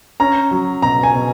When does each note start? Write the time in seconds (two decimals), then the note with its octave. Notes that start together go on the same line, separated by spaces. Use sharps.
0.20 C#4 A#5
0.51 F#3
0.82 B2 A#5
1.03 G#5
1.14 B2